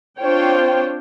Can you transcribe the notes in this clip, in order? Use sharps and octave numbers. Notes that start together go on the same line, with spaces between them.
C4 D4 F4 C5 C#5 G5